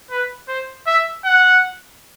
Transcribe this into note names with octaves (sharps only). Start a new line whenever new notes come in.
B4
C5
E5
F#5